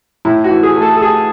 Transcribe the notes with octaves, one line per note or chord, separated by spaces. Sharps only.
A2 E4
F#4
E3
G#4
A3
A4
A4
A3 G#4